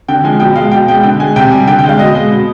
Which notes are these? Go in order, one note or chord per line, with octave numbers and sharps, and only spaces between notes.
D3 G5
F3 G#3 G#5
B2 G5
G#3 F5
B2 G5
G#3 G5
D3 G5
G#3 G#5
C3 G5
G3 G#5
D3 G5
G5
G#3
F5
B2 D#5
G#3
B2